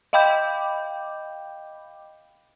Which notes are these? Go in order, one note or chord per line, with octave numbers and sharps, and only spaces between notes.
D#5 F5 G5 B5 D6 G6